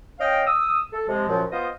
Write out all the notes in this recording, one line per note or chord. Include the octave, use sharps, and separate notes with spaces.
C#4 D#5 F5 G5
D#6 E6
A4
C3 F3 G#3
F#2 A#2 F3
B3 F4 C5 D#5